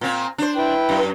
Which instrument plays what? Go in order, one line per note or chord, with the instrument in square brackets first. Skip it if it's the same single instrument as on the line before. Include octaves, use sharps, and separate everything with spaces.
[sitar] A#2 C4
D4 C5
[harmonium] E4 B4 G5
[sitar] F#2